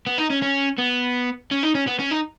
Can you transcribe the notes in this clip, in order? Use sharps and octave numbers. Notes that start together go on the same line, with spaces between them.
B3
D#4
C#4
C#4
B3
C#4
D#4
C#4
B3
C#4
D#4